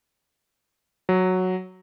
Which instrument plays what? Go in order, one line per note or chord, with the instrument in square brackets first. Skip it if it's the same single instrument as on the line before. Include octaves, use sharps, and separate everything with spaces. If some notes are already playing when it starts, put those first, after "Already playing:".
[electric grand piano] F#3